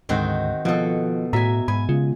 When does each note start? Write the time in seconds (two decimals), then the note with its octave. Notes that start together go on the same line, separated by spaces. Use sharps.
0.09 D2 G#2 D3 D#3 C4 F#4
0.65 B2 F3 F4 A4
1.33 A2 F#4 E5 G#5 A#5
1.68 G#2 G#5 B5
1.89 C#3 G#3 F4